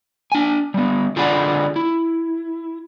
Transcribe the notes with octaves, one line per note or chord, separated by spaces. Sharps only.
D4 G#5
G3 B3
D3 F4 G#4 B4 D5 F#5
E4